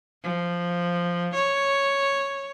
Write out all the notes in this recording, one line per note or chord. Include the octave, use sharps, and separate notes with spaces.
F3
C#5